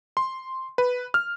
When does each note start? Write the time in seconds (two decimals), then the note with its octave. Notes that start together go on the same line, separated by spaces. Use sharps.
0.17 C6
0.78 B4
1.14 F6